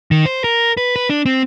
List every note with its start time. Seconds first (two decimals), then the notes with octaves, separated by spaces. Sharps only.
0.11 D#3
0.26 C5
0.44 A#4
0.77 B4
0.96 B4
1.10 D4
1.26 C4